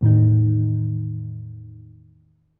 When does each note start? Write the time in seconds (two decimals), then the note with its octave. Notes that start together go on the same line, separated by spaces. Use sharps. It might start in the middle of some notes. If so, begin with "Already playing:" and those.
0.01 E2 A2 D#3 D#4